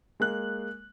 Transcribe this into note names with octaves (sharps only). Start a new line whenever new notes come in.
G#3 A#3 F#6